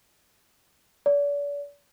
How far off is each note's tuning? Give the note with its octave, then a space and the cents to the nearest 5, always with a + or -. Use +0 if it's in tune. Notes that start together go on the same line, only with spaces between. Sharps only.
D5 -40